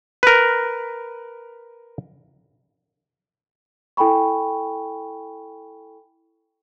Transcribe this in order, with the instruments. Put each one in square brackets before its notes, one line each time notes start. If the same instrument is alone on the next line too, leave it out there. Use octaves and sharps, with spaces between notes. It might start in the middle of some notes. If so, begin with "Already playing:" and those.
[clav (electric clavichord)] A#4 B4
[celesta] E4 A4 G5 G#5 B5 C#6